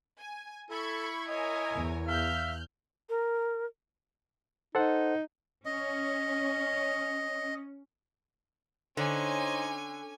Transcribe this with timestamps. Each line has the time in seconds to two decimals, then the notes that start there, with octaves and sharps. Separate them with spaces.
0.19 G#5
0.71 E4 A4 B5 C#6 G#6
1.28 A#4 C#5 D#5 G#5
1.73 E2
2.08 E5 F5 F6 G6
3.09 A#4
4.75 D#4 A4 C5 F#5
5.65 C#4 D#5
8.97 D3 C#4 D#4 C5 C#5 G#5